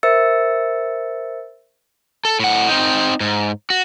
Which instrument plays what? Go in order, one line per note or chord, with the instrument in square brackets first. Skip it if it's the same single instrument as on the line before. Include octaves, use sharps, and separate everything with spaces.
[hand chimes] A#4 C5 E5 E6 A6 C#7
[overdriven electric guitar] A4
A2 F#5
C4 D#4
G#2
F#4